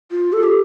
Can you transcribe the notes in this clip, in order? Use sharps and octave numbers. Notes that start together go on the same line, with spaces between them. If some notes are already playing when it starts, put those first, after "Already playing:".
F4
A4
G4